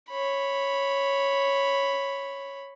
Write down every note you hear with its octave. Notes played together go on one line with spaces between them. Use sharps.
C#5 B5